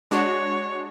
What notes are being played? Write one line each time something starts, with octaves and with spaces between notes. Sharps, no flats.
G#3 D4 F#4 C#5